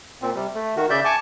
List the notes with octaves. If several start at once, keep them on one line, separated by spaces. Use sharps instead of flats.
A#2 C4
C3 G3
A3
D#3 F#4
C#3 D5 E5 G6
G#5 A5 C#6 D6